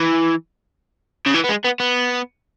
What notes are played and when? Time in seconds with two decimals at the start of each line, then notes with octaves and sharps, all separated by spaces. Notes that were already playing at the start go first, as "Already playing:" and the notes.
Already playing: E3
1.26 C#3
1.34 E3
1.44 B3
1.49 G#3
1.65 B3
1.80 B3